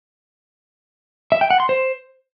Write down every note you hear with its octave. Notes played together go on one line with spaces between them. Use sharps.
E5
G5
F#5
C6
C5